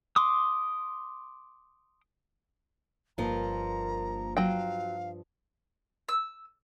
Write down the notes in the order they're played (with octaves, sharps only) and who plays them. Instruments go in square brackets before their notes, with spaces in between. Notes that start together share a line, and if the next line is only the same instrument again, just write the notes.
[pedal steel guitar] C6 D6 D#6
[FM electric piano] G1 A#3 A#4 [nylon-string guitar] G2 F3 [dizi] A#5
[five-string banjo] F#3 G5 [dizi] F5
[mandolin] E6